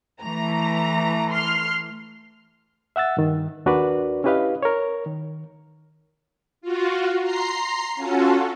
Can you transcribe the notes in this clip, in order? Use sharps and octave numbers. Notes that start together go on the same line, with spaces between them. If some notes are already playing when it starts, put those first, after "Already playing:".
E3 A3 A#5
C6 F6 C7
E5 F#5 E6 A6
G2 D#3
D#2 D4 F#4 A#4 B4 D5
C#4 E4 G4 B4 D#5 F5
A#4 C#5
D#3
F4 F#4
A#5 C6 C7
C#4 F4 F#4 A4